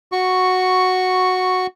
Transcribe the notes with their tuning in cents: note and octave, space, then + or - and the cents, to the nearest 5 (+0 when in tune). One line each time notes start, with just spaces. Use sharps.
F#4 -5 C#6 +0